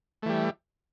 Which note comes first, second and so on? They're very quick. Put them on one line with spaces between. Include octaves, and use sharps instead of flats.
A3 E3 G3